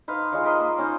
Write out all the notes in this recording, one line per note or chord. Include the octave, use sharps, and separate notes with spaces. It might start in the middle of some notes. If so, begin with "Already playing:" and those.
D#4 B4 C5 F5
G#3 D#4 F4 C#5
A#4 B4 D#5 C6
A#3
C#4 D#4 C5